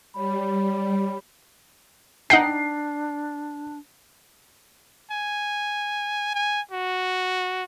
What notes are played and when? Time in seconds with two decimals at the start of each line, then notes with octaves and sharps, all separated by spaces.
0.14 G3 C#5 B5
2.30 D4 D#4 F#5 G5 C7
5.12 G#5
6.35 G#5
6.71 F#4